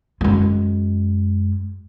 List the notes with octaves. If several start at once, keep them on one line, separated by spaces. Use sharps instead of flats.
F#2 G#3